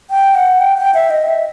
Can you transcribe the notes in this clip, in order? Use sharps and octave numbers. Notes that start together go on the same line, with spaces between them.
G5
F#5
G5
G5
E5
D#5
E5